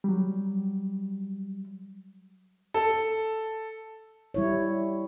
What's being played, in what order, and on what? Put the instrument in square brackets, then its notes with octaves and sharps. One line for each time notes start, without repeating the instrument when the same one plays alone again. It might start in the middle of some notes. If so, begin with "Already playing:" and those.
[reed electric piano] F#3 G3
[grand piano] A4
[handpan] G3 E4 C#5